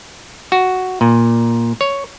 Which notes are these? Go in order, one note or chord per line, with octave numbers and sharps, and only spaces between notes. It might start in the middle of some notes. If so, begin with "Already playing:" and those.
F#4
A#2
C#5